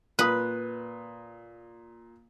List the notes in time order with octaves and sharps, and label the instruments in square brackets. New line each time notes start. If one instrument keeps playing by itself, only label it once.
[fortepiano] A#2 D#6 [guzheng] B4